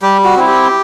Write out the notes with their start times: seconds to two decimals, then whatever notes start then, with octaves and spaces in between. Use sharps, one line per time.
0.02 G3 G4
0.24 F#4
0.36 C4 E4
0.47 G4